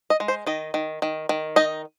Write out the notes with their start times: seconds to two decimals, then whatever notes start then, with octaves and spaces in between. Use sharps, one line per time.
0.10 D#5
0.20 G#3
0.28 C5
0.47 D#3 D#5
0.74 D#3
1.02 D#3
1.29 D#3
1.56 D#4 D#5